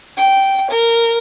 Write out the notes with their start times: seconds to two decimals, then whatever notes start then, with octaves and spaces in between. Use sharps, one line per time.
0.16 G5
0.70 A#4